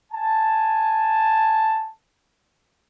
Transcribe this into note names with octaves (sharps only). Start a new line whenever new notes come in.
G#5 A5